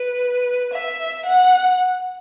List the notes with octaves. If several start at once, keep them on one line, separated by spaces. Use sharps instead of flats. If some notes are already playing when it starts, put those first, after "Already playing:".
Already playing: B4
E5
F#5